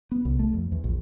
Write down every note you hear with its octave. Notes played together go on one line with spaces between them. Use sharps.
B3
C2
A3
F2
E2
A#1